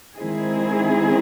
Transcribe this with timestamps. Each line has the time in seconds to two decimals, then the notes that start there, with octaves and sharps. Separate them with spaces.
0.15 D#3 G#3 C4 E4 G#4